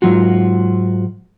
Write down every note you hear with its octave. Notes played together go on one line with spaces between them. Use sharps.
G#2 F#3 F4 F#4